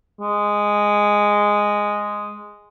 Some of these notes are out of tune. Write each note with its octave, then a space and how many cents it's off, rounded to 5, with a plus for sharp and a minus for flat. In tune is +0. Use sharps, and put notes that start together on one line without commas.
G#3 -5